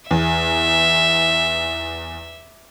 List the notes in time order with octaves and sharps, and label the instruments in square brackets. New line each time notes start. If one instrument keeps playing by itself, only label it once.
[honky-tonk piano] E2 [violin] E5